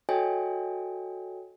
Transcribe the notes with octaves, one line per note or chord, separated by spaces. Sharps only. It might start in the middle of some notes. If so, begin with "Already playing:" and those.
F#4 A4 C#5 D#5 G5 G#5